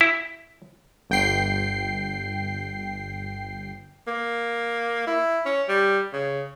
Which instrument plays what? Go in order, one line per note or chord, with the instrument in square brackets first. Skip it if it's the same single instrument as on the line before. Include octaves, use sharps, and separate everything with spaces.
[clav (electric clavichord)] E4
[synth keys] G1 G5 C7
[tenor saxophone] A#3
E4
C#4
G3
C#3